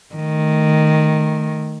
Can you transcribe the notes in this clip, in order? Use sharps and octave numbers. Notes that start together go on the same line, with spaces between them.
D#3 A3